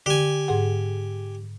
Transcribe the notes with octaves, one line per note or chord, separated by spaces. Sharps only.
D3 G4 G#5
G#2 G#4 F#5